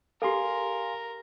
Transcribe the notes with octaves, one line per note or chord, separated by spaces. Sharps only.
G4 A4 A#4 F5 G#5 C6